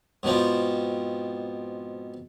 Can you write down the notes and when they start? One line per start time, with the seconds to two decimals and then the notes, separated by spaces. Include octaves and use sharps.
0.23 G#2 B2 F3 C4